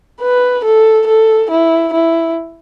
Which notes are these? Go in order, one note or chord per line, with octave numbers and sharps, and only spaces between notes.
B4
A4
A4
E4
E4